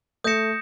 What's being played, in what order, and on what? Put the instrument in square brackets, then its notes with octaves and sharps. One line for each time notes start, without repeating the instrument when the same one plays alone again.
[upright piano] A3 [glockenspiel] D#6 G6 A#6 C#7 E7